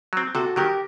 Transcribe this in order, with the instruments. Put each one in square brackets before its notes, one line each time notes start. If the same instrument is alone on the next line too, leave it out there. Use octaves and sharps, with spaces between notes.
[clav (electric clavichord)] F#3 C4
[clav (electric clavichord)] C3 [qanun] F#4 A4
[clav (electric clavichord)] D#3 F#3 [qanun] G4 A#4